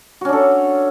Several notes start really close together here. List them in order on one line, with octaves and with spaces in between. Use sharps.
F#4 C#4 D4 A4